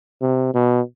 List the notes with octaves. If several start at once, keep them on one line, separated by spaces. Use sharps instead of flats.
C3
B2